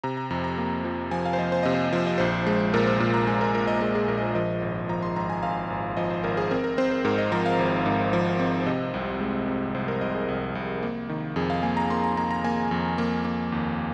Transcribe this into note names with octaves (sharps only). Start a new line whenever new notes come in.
C3 A#5
A#5
F2 A#5
A#5
A#3
F3
F3 G#5
F5
C5
F3 D#5
C5
C3 D#5
C5
D#5
F3 C5
D#5
A#1 C5
G#3
A#2 A#4
C5
A#2 C5
A#5
G#3 G#5
A#4
A#1 A#4
D#5
G#3 A#4
G#4
A#1 A#4
D#5
C5
F3 D#5
G#1
F3 A#5
C6
G#1 A#5
G#5
G#1 F5
G#1
F3 D#5
C5
G#1 A#4
G#4
C4 A#4
A#4
C4 C5
C5
G#2 A#4
D#5
F3 A#5
F5
G#1
G#2
F3
C4
C5
C3 D#5
C2
G#3
C3
C2 C5
A#4
C2 D#5
G#4
C2
C2
A#3
D#3
F2 G#4
F5
A#3 G#5
A#5
A#3 C6
A#5
A#3 A#5
A#5
A#3 G#5
F2
A#3
A#3
D#2